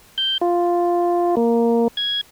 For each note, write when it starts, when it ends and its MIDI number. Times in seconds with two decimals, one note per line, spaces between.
0.18 0.38 91
0.41 1.35 65
1.37 1.88 58
1.97 2.21 92